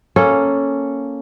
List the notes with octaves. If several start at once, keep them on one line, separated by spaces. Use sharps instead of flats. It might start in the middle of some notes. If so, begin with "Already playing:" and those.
A#3 C#4 A4